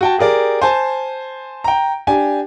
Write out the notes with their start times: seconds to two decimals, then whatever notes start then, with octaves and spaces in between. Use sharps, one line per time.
0.01 F#4 G5 A5
0.18 G4 G#4 A#4 D5
0.61 C5 G#5 A5
1.64 G5 A#5
2.07 D4 G4 G#5